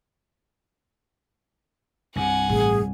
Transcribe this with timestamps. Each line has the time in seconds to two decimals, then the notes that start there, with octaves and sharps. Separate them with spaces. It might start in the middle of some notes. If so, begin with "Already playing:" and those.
2.16 C2 G2 C3 F#5 G#5
2.49 A1 G#4